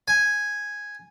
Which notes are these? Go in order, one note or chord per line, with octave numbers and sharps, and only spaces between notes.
G#5